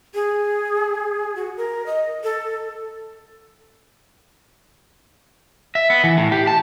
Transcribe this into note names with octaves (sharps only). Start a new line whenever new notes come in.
G#4
F#4
A#4
D#5
A4
E5
B3
E3
A2
G4
A5